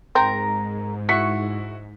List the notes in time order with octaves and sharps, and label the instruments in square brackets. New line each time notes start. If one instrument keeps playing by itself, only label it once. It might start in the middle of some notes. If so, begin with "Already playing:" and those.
[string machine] G#2 [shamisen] C4 [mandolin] A#4 A#5
[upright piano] E4 F#4 B6 [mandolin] C#6